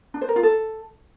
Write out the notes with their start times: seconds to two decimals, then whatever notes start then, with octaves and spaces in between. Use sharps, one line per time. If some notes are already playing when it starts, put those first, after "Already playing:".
0.14 D4
0.21 C5
0.29 A#4
0.36 F4
0.43 A4